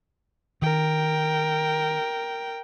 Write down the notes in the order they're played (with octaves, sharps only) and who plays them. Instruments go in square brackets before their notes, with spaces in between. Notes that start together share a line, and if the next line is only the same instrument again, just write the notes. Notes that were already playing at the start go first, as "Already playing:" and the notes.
[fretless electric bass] D#3 [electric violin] A#4 G5